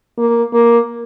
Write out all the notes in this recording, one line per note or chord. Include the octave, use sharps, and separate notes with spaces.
A#3
A#3